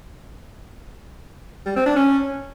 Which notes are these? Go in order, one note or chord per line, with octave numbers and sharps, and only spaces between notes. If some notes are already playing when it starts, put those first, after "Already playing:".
G3
C4
D4
C#4